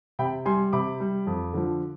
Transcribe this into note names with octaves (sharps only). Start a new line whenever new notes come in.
C3 G5 B5
G3 G#5 C6
C3 B5 D6
G3
F2
D3 F3